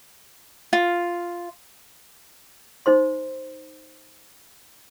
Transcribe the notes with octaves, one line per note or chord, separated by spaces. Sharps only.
F4
D#4 C5 C6